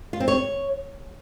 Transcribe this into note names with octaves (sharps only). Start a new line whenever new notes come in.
F4
C4
C#5